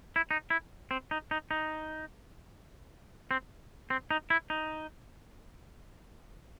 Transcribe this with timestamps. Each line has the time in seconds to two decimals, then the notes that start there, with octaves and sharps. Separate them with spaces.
0.16 E4
0.31 D#4
0.50 E4
0.91 C4
1.11 D#4
1.31 D#4
1.51 D#4
3.31 C4
3.90 C4
4.11 D#4
4.30 E4
4.50 D#4